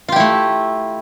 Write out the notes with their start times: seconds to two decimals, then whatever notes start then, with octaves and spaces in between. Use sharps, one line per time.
0.08 F4
0.12 G4
0.16 E4
0.20 A3